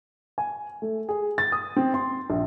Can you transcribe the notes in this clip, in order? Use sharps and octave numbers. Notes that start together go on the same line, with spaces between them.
G#5
A3
G#4
A6
D#6
C4
C6
A#1